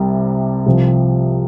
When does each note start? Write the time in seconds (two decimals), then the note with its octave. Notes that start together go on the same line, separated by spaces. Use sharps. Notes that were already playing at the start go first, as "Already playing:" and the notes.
Already playing: C2 C3 G3
0.66 C2 C3 F3